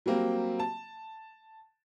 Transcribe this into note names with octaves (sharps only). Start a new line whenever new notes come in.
F#3 G3 A#3 C4
A5